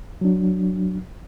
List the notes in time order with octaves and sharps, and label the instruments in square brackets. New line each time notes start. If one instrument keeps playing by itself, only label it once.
[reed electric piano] F#3 D4